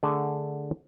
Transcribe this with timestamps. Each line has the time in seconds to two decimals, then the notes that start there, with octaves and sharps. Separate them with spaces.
0.03 D3 A3 G#4 D5 F#5 A5